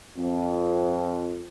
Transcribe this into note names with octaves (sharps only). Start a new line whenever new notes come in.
F2